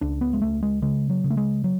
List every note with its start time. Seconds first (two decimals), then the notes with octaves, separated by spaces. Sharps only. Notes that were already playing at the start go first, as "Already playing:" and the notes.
0.01 C#2 D4
0.21 B3
0.33 G#3
0.42 C#2 A3
0.63 G#3
0.82 C#3 G#3
1.10 F#3
1.24 C#3
1.30 A3
1.37 G#3
1.64 F#3